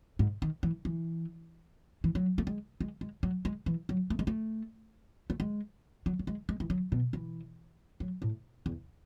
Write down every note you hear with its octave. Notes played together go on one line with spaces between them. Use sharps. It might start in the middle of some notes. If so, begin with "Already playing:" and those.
G#2
D#3
E3
E3
E3
F#3
A3
G#3
G#3
G#3
F#3
G#3
E3
F#3
A3
G#3
A3
A3
G#3
F#3
F#3
G#3
G#3
E3
F#3
B2
E3
F#3
A2
E2